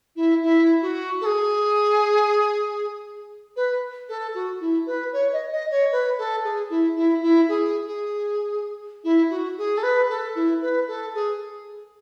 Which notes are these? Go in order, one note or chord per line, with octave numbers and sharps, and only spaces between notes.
E4
E4
F#4
A4
G#4
B4
A4
F#4
E4
B4
C#5
D#5
D#5
C#5
B4
A4
G#4
E4
E4
E4
G#4
G#4
E4
F#4
G#4
A4
B4
A4
E4
B4
A4
G#4